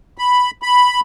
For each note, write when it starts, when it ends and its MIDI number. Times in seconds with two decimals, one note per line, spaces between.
0.18 0.51 83
0.62 1.00 83